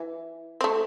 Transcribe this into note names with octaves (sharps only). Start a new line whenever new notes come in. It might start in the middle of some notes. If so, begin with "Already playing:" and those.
Already playing: E3
C4
A3